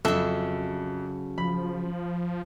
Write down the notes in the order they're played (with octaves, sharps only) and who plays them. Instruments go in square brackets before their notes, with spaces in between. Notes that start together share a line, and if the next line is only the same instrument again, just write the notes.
[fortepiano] F2 [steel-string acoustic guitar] C#3 F#3 [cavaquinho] A4 E5
[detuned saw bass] F3 [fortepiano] B5